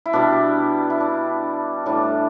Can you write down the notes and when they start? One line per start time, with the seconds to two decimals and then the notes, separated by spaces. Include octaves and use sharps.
0.06 E4
0.13 B2 G3 D4
0.90 E4
1.00 D4
1.86 A2 E3 G3 D4